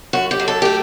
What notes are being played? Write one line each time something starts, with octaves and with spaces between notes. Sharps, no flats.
F#2 F#4
G4
F#3
A4
A3 G4